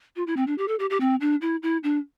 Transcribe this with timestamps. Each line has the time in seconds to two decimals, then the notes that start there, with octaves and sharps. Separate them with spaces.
0.16 F4
0.27 E4
0.37 C4
0.47 D4
0.58 G4
0.68 A4
0.79 G4
0.90 G4
1.01 C4
1.21 D4
1.42 E4
1.63 E4
1.84 D4